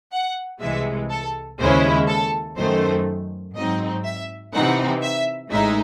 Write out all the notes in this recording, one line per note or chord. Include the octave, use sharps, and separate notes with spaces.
F#5
C2 C3 E3 G#3 E5
A4
D#2 C#3 G#3 C#4 E4 C5
A4
F#2 D#3 A3 C5
G#2 F#3 C4 D#4 D#5
E5
C3 E3 C4 D#4 F#5
E5
A1 A2 G#3 D#4 E5